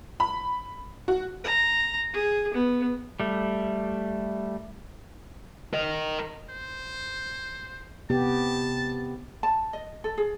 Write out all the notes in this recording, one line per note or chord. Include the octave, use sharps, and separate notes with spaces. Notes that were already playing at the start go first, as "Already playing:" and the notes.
B5
F#4
A#5
G#4
B3
G3 A3
A#4 D#5
C5
C3 B3 G4 A5
A5
D#5
A4
G#4